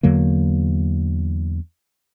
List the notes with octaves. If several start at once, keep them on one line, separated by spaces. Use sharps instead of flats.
E2 D3 F#3 A#3